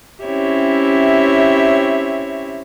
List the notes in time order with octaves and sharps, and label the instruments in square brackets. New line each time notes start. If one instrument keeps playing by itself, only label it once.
[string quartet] C4 C#4 E4 G4 C#5 E5